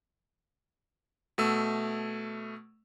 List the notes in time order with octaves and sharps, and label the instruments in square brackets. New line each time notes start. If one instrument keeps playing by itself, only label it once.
[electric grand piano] B2 A3 E6